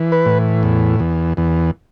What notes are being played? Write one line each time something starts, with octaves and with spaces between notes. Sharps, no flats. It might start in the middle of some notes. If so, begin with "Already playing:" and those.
Already playing: E3
B4
A2
E2
E2
E2